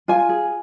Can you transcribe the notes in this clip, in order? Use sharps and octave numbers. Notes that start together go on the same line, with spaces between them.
F4 G#5
G#4